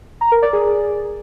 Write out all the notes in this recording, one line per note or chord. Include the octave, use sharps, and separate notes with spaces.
A#5
A#4
D5
G#4